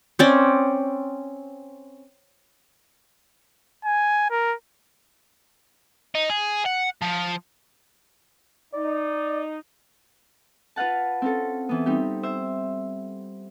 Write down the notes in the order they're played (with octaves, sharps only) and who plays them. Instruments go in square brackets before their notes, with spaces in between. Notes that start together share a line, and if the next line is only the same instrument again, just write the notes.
[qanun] C4 C#4 D5
[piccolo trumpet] G#5
A#4
[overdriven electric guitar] D#4
G#4
F#5
F3
[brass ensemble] D#4 [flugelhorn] D5
[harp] F4 B4 F5 F#5 A5
C4 C#4 A4
E3 B3
G3 C4 D#4 G4
C5 E5